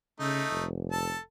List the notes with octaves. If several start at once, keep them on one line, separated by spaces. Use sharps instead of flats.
C#3 A3 D#4
F1
A4 A5